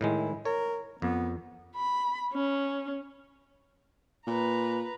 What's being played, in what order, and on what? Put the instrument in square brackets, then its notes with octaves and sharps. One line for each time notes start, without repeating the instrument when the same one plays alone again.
[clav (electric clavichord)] A2 D#3 G#3 [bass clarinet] E4
[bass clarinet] A#4 [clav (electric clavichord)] C#5
[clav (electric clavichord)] F2 [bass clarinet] B3
[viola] B5
C#4
[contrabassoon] A#2 [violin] B4 A#5